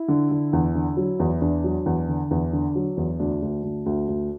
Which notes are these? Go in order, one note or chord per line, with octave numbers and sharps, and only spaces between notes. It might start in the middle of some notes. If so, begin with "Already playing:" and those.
Already playing: E4
D3
D3
E2
D3
F#3
E2
E2 D4
F#3
E2
D3
E2
D3
F#3
E2
D2 D4
D2
D2
D2
D2